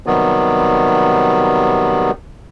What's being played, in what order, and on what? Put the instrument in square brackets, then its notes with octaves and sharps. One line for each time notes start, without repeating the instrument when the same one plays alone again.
[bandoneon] C3 D#3 F#3 G3 B3